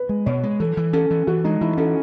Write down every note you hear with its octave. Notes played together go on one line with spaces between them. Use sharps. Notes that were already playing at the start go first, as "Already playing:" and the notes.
Already playing: B4
G#3
B2 C#5
G#3
E3 A4
E3
C#4 A4
E3
E3 F#4
G#3 D#4
E3 E4
C#4 A4